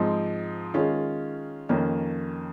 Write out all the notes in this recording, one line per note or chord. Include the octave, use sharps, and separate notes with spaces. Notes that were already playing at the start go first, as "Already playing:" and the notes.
Already playing: G#2 F3 G#3 C4
D#3 G#3 C#4 F4
F2 D#3 A#3 C#4